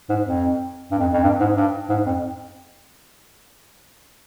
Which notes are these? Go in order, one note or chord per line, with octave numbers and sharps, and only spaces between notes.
G#2
F2
G2
F2
F2
G2
G#2
G2
G#2
F2